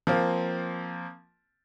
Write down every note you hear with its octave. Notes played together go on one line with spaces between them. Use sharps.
F3 A#3 C4